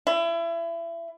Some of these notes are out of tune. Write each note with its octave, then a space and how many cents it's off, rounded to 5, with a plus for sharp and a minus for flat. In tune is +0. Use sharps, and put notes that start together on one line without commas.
E4 +30